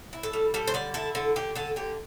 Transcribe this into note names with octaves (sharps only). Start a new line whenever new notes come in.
E4
A4
G3
G3 A4
C5
D3 D5
E4 A4
D3 A4
D3 G4
D3 A4
D3 G4